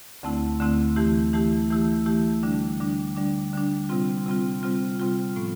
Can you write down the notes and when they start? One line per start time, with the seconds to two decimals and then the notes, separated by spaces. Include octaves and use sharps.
0.23 D2 D3 A3 C4 E4
0.60 D2 D3 A3 C4 E4
0.96 E3 A3 E4 G4
1.33 E3 A3 E4 G4
1.70 E3 A3 E4 G4
2.06 E3 A3 E4 G4
2.43 D3 G3 D4
2.80 D3 G3 D4
3.16 D3 G3 D4
3.53 D3 G3 D4
3.89 C3 G3 C4 F4
4.26 C3 G3 C4 F4
4.63 C3 G3 C4 F4
4.99 C3 G3 C4 F4
5.36 A2 F3 B3